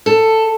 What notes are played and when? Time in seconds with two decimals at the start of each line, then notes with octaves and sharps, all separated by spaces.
0.06 A4